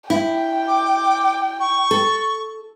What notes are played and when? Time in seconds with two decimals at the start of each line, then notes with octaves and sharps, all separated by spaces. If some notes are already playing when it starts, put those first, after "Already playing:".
0.10 E4 G5
0.68 D6
1.60 C#6
1.91 A4